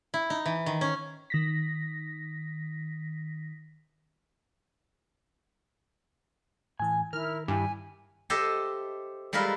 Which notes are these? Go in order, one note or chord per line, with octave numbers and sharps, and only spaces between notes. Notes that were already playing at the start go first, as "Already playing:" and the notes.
E4
D#4
E3
D#3
C#4
D#3 A#6 B6
A2 E3 G#5 A5
D#3 E4 A#4 F6
G2 E4 G4 G#5
G4 A4 C5 D#5 E5 A5
G3 G#3 F4 A#4 B4 E5